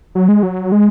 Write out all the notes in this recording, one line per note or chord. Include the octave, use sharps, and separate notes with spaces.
F#3
G#3
F#3
G#3